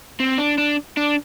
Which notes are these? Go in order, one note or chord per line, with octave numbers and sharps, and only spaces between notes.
C4
D4
D4
D4